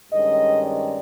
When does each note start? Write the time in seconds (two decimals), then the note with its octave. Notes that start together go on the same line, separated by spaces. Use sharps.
0.12 G2 D#3 G#3 C#4 D#5
0.63 D5